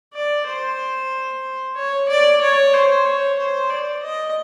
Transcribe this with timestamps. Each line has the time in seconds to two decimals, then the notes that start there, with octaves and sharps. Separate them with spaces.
0.14 D5
0.47 C5
1.75 C#5
2.09 D5
2.41 C#5
2.73 C5
3.05 C#5
3.38 C5
3.70 D5
4.02 D#5